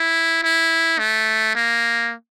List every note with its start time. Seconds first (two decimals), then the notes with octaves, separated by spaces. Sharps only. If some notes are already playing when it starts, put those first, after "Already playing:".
Already playing: E4
0.43 E4
0.99 A3
1.55 A#3